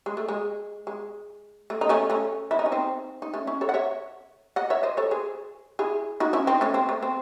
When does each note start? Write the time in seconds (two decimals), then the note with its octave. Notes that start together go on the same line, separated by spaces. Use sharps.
0.06 G#3
0.17 A3
0.28 G#3
0.87 G#3
1.70 A3
1.81 D#4
1.89 A3 C#4
2.10 A3 C#4
2.51 E4
2.59 D#4
2.66 C#4
2.72 C4 D#4
3.22 D#4
3.34 A3 C#4
3.47 C#4 E4
3.61 A4 C#5
3.69 F#5
3.74 C#5 E5
4.56 D#5 F#5
4.70 C#5 E5
4.83 C5 D#5
4.97 A4 C#5
5.11 G#4 C5
5.79 E4 G#4
6.20 D#4 F#4
6.33 C#4 E4
6.47 C4 D#4
6.61 A3 C#4
6.74 C4
6.89 A3
7.02 C4